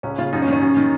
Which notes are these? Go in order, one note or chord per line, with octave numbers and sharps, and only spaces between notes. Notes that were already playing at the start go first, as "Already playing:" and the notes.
C#2 C#4
C#3 F4
F#2 D#4
C#4
D#3
C#4
F#2
D#3